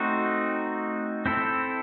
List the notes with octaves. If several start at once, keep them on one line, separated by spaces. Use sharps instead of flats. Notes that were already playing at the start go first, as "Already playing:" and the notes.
Already playing: A3 C4 D#4 F#4
C4 E4 A4